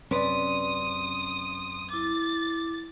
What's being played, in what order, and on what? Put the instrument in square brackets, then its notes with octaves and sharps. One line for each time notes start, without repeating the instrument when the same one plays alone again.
[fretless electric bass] F#2 C3 C#4 [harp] B4 D5 [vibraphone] C6 [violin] D#6
[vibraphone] E4 D6 [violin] A6